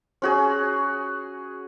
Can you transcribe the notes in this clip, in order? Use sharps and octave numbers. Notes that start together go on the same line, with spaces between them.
C#4 F#4 G#4